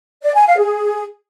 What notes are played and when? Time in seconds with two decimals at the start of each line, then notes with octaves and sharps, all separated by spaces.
0.23 D5
0.35 G#5
0.47 F5
0.58 G#4